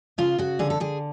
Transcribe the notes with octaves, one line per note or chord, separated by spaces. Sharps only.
C#3 F4
C#3 F#4
D3 G#4
A4
D3 G#4